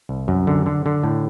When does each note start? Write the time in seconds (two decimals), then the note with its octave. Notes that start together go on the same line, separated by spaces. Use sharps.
0.09 C2
0.28 F#2
0.47 D3
0.66 D3
0.86 D3
1.03 A2